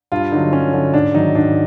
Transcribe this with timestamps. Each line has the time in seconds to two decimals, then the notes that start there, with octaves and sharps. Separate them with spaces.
0.12 G2 F4
0.32 D3 F#3 D#4
0.53 G2 C#4
0.73 D3 F#3
0.93 G#2 D4
1.14 D#3 F#3 D#4
1.35 G#2 D4